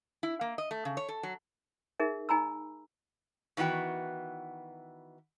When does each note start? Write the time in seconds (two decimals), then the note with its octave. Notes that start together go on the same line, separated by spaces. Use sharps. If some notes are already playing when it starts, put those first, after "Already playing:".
0.23 E4
0.41 A#3
0.58 D#5
0.71 A3
0.85 C#3
0.97 C#5
1.09 A4
1.23 F#3
2.00 D#4 G#4 A#4 E5
2.29 D#4 G#5 A#5 B5 E6
3.57 D#3 E3 B3 F#4 G5